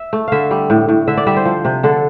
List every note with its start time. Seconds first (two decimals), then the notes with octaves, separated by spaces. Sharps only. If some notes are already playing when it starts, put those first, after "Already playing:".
Already playing: E5
0.13 A3
0.28 D3 E5 F5
0.51 G3
0.70 A2
0.89 A2
1.08 D3 E5
1.17 D5
1.27 G3 E5
1.36 C5
1.45 F3
1.65 C3
1.83 D3 A4